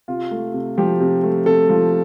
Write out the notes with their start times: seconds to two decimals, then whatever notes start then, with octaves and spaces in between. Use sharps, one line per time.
0.08 C3 F4
0.31 A3
0.54 C3
0.78 F3 G4
1.00 C3
1.24 A3
1.46 C3 A4
1.69 F3